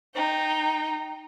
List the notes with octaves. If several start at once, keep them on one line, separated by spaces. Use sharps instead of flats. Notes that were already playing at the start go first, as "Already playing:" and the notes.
D#4 G5